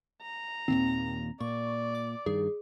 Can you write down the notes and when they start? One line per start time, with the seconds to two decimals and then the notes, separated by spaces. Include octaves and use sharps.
0.22 A#5
0.68 D#2 A#2 D#3 C4
1.40 A#2 D5 C#6
1.95 D6
2.26 G2 D#3 G#4